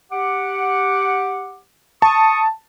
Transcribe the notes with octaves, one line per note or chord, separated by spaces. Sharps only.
G4 F#5 D6
A5 C#6 D#6